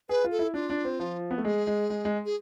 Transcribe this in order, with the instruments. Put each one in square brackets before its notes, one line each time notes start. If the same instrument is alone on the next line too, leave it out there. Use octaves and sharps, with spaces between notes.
[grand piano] G#4 [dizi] B4
[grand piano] F4
[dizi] A4
[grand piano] E4
[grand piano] D4 [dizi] F4
[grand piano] D4
C4
F3
B3
A3
[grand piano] G#3 [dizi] G#4
[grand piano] G#3
G#3
G#3
[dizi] G#4